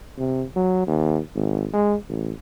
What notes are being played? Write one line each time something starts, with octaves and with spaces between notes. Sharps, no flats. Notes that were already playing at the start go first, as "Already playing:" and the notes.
C3
F#3
D#2
G#1
G#3
A1